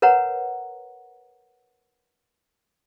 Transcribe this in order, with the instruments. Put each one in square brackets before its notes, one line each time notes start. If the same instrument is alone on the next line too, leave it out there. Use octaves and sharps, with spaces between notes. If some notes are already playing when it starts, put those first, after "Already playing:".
[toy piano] A#4 B4 C#5 F#5 A#5